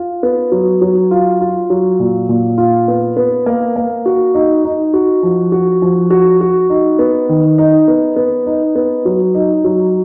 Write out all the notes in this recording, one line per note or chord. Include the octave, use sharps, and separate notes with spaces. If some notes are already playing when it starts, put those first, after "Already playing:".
Already playing: F4
B3
F#3
F#3
F4
F4
F#3
A#2
A#2
F4
B3
B3
A#3
A#3
F#4
D#4
D#4
F#4
F3
F#4
F3
F#4
F#4
D#4
B3
D#3
D#4
B3
B3
D#4
B3
F#3
D#4
F#3